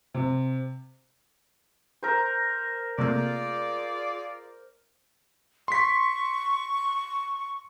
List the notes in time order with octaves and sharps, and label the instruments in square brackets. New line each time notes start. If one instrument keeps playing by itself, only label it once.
[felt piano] C3
[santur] A#4 C5
[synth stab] C3 A3 A#3 [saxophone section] F4 G#4 D5
[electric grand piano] C6 B6 [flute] C#6